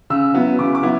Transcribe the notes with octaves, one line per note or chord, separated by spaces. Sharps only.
C#3 E6
F#3 B3 E4
C#3 D6
D6
F#3 B3 E4